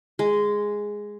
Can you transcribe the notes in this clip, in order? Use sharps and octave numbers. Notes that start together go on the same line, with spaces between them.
G#3